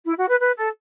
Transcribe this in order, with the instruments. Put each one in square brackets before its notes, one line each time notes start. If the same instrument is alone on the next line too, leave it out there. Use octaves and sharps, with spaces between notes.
[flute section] E4
F#4
B4
B4
A4